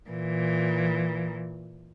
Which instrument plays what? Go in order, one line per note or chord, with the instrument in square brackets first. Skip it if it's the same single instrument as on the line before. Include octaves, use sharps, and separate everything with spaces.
[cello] A#2 E3